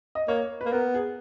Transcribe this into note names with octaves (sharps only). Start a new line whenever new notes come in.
D#5
A#3 C#5
A#3 B4
B3 A#4
G#4